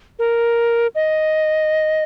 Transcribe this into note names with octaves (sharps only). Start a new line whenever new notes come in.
A#4
D#5